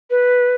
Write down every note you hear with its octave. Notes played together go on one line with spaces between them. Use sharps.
B4